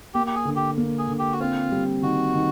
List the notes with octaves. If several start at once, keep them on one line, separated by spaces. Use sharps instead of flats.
A#3 G4
G4
G#4
D3
G4
A#3
G#4
D3
G4
F#4
C4 F4
G3
D#3 F#4
D#3